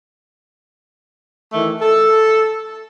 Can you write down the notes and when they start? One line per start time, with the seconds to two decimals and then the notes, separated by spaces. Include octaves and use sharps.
1.53 D#3 E3 A3
1.82 A4